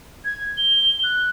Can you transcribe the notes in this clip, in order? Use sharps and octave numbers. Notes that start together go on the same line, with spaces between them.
G#6
G7
F#6